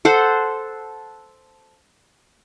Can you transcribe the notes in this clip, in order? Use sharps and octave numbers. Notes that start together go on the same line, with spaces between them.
A4 C5 F#5